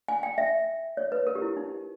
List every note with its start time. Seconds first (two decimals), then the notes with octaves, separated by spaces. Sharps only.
0.08 G#5
0.23 G5
0.38 E5
0.97 C#5
1.12 B4
1.27 A#4
1.35 G4
1.42 E4
1.57 D#4